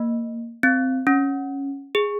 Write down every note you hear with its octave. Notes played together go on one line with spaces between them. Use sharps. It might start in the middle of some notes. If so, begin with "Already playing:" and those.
Already playing: A#3
C4
C#4
G#4